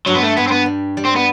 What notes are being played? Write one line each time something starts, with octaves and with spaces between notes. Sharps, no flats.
G2 F#3
B3
A3
G2 B3
C4
B3
G3
G3
C4
B3